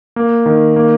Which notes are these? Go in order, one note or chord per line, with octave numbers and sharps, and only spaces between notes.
A#3
D#3
A#3